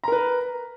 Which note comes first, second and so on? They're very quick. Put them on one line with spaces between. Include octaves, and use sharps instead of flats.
A#5 A#4 B4